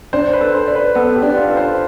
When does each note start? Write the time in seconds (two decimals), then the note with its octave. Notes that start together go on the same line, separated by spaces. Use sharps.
0.13 D4 C5
0.33 B4
0.41 A4
0.55 C5
0.68 D5
0.75 B4
0.95 B3 A4
1.16 G4
1.22 D4
1.37 F4
1.51 A4
1.57 C5